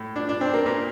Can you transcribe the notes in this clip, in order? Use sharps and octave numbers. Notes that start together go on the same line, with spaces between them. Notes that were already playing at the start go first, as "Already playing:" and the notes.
Already playing: A2
D4
D4
C4
A#3
A#2 A#3